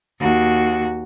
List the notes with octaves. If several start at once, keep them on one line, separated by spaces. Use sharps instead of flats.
D#2 F#4